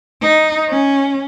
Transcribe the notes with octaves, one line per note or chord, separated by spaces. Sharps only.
D#4
C#4